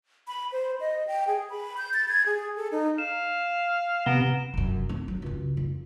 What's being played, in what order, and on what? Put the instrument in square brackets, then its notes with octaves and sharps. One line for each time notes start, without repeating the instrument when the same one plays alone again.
[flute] B5
C5
D#5
G5
G#4
B5
G6
A6
G#6
G#4
A4
D#4
[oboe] F5 [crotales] E7
[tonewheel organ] C3 [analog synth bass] B3 [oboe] A#5 [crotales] D7 E7 G7
[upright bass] F1 F#2
C4
F#3
C#2 F#2
F2